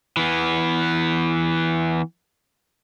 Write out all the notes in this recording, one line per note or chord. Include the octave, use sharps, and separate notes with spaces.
E3 B3